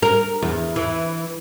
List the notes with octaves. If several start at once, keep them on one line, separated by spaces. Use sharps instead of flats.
A#4
E2
E3